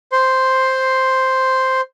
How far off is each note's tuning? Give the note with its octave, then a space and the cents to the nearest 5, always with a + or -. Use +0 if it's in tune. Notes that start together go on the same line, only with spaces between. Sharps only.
C5 +0 C6 +0